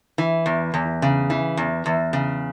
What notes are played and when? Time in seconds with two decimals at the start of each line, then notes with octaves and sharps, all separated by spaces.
0.18 E3
0.46 E2
0.74 E2
1.02 C#3
1.30 E3
1.57 E2
1.86 E2
2.13 C#3